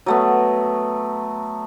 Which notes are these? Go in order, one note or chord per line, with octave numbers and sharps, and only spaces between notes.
F#3 A3 B3